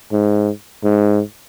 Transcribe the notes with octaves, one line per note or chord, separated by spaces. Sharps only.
G#2
G#2